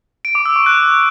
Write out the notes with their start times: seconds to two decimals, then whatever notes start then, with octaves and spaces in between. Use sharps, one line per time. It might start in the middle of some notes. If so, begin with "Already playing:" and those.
0.25 D7
0.35 D6
0.45 E6
0.56 C#6
0.66 F#6